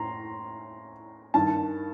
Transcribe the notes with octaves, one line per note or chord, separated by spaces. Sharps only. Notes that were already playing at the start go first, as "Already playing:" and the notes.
Already playing: A2 A#5 C6
G2 D#3 A5